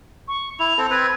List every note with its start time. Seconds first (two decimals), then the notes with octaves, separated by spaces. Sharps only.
0.28 C#6
0.59 E4 F7
0.78 C4 A4
0.91 C4 B4 G#6